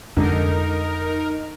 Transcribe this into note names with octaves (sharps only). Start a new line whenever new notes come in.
F2 D3 G#3 D#4 A#4